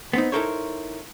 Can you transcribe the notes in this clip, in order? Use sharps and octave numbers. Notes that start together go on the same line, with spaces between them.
B3 C4 D#4
D#4 E4 A4 A#4 C5 C#5